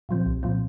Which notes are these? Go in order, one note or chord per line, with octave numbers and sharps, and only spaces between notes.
A#2 F3 C4
C2
A#2 F3 C4